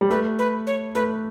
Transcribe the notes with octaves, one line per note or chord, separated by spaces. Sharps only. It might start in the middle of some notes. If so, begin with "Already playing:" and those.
G3
A3 B4
B4
C#5
A3 B4